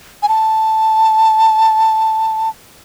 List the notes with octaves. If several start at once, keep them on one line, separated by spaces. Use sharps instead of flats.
G#5
A5